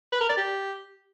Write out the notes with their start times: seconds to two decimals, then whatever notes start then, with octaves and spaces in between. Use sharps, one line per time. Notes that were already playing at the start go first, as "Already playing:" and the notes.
0.12 B4
0.21 A#4
0.29 D5
0.37 G4